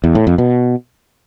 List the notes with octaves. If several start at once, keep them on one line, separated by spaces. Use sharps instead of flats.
E2
A2
F2
B2